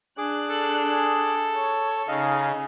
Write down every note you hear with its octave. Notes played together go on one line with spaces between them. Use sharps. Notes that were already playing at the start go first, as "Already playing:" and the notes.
D4 G#4 D6 F#6
A4
C#5
C#3 D#4 G#4 D#5 F5